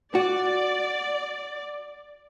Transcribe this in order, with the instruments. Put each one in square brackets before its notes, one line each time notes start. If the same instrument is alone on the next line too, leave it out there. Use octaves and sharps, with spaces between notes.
[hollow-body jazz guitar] F#4 [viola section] D5